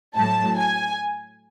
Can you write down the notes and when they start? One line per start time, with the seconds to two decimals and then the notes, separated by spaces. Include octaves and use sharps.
0.17 A2 F#3 A5
0.57 G#5